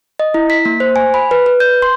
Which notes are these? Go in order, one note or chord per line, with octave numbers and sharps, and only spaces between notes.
D#5
E4
B6
A#3
C5
G#5
B5
B4
B4
G6
C6